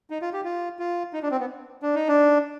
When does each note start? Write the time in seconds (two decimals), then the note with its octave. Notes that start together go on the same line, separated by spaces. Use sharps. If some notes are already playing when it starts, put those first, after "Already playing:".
0.10 D#4
0.22 F4
0.33 G4
0.45 F4
0.79 F4
1.13 D#4
1.22 D4
1.31 C4
1.40 B3
1.82 D4
1.95 D#4
2.08 D4